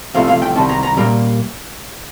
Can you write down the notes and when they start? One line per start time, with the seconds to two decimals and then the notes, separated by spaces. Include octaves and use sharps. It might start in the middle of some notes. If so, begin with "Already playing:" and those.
0.14 C2 C3 F3 A3 F5
0.28 F5
0.42 G5
0.56 C2 C3 D#3 A5
0.69 A#5
0.83 A#5
0.97 A#2 G3 A#3 A#5